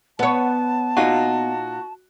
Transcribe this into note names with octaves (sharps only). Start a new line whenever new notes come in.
B3 C#5 A5
A#2 D#4 F4 F#4